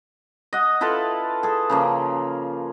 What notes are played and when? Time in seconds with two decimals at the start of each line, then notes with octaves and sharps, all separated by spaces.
0.53 D#5 F#5
0.81 E4 F4 A4 B4
1.43 G#4 A4
1.70 C#3 F3 A#3